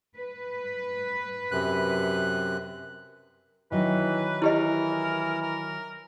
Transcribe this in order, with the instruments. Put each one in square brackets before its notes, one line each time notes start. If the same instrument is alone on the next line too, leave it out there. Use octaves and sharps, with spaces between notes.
[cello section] B4
[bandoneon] F#2 C3 F#6
[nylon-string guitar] D#3 F#3 [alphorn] E3 [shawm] B4
[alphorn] E3 [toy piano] E4 G4 D#5 [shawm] A#4
[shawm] A#4